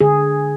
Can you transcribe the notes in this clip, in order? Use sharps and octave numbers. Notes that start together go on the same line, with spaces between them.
D3 G#4